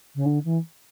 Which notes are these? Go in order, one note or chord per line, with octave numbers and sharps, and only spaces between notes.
C#3
D3
E3